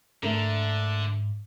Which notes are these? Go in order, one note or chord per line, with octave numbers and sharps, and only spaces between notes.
G#2 D3 A3 D4 A#4